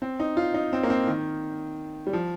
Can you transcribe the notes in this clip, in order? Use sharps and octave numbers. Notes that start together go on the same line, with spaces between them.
C4
D#4
F4
D#4
C4
A#3
C4
D#3
G3
F3